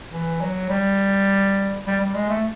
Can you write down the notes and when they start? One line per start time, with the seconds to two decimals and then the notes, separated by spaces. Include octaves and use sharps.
0.12 E3
0.41 F#3
0.69 G3
1.87 G3
2.01 G3
2.15 G#3
2.30 A3